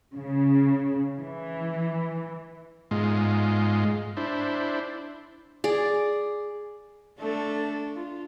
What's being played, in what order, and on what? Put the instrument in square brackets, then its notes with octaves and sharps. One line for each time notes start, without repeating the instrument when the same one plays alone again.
[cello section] C#3
E3
[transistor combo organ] G#2 G#3 F4
D4 E4 C5
[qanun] G#4 D5
[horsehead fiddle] A3 A4 [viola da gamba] D4
[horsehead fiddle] F4